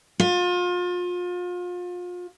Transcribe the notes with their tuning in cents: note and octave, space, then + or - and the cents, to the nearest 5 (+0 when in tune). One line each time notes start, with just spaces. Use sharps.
F4 +35